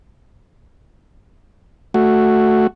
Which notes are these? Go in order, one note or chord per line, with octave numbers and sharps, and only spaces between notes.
A3 F#4